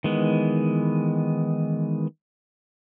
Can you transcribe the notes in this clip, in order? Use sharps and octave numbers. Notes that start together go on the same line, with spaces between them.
D#3 E3 G#3 B3